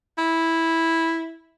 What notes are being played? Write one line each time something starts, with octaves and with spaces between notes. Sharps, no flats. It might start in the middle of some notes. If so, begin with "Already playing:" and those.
E4